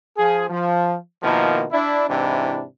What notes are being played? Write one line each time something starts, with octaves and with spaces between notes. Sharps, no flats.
F3 G#4
F3
B2 D#3 F3 A#3 E4
D4 E4
G#2 C3 E3 D4 E4